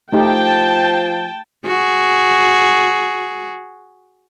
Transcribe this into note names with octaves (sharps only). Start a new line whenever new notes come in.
F3 A3 D#4 G4 G5 A5
F#4 G#4